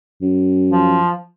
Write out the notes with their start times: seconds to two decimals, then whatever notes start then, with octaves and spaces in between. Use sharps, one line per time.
0.21 F#2
0.71 F3